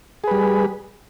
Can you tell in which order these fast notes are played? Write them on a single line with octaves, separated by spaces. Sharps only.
G#4 B4 G3